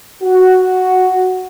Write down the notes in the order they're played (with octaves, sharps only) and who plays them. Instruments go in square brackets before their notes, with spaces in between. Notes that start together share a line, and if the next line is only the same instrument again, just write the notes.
[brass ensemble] F#4